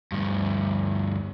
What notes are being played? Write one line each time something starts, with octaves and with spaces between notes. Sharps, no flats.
D2 G2